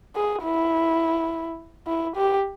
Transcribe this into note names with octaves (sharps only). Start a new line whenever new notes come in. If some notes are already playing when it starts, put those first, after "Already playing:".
G#4
E4
E4
G4